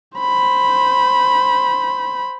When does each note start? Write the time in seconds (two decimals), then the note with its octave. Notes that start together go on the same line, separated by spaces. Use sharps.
0.18 C5 B5